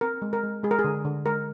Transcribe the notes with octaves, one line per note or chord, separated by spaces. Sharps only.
C4 A#4
G#3
A#4
G#3
G#3 G#4
A#4
G#4
D3
D3
G#3 A#4